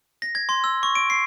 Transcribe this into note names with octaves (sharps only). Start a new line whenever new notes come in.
A#6
G#6
C6
E6
C#6
D7
C7